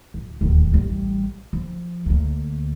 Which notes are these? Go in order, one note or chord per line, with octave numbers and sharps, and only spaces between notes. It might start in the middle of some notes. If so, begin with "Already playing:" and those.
D1
D1 D#2
A1 G3
F3
D2 A#3